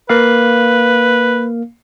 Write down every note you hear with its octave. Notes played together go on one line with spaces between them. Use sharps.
A#3 B4 F5